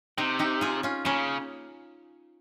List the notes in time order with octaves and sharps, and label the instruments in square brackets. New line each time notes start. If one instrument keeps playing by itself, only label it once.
[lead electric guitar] C3 [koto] C4 D#4
[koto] D#4 G4
F4 G#4
C#4 F4
[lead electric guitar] C#3 [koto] A#3 C#4